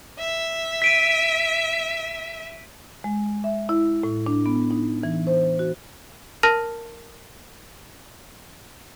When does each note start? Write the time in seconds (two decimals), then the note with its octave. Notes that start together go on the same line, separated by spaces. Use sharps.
0.18 E5
0.82 B6 D7 D#7
3.04 G#3
3.44 E5
3.69 E4
4.03 A2
4.26 D4
4.46 B3
4.71 D#4
5.03 E3
5.27 C5
5.59 F#4
6.43 A#4 A5 F6 A#6